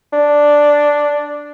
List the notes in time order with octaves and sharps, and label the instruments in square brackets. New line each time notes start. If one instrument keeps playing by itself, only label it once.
[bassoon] D4